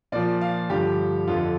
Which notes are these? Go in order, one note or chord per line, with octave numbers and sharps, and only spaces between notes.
A#2 F3 D5
F5
G2 D3 F3 G4
F2 D3 F3 F4